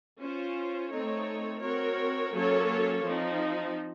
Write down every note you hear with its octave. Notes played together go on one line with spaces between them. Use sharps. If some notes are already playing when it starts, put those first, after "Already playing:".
C#4 F4 C5
A3 C4 D#4 A4 C#5
C4 F#4 A#4 C#5
F#3 A#3 C#4 A4 C#5
F3 C4 D#4